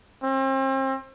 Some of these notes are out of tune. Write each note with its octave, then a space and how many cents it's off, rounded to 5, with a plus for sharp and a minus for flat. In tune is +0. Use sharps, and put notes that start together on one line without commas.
C4 +40